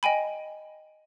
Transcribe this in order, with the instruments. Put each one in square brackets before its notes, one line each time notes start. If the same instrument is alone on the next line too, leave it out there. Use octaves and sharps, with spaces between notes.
[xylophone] D#5 G5 G#5 B5